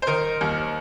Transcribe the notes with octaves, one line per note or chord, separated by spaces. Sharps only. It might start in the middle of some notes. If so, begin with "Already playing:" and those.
C5
D#3 A#4
D#2